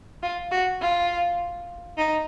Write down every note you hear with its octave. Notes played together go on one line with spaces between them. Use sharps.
F4
F#4
F4
D#4